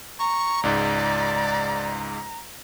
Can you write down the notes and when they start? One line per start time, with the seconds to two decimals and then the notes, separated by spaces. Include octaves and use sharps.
0.19 A#5 C#6
0.63 C#2 G#2 D5